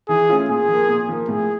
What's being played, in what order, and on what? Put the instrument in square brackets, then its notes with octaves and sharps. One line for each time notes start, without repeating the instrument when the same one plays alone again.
[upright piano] E3 [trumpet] G#4
[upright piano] A3 C#4 F4
[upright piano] A#2 [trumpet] G#4
[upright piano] F3 A#3
A#2
F3 A#3
[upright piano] A2 [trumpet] G#4